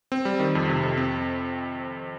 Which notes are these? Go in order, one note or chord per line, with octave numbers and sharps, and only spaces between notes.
C4
G3
D#3
F2
C3
F2
C4